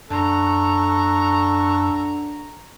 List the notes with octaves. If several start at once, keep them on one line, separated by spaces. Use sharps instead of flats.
F#2 D3 A4 A#5 C#6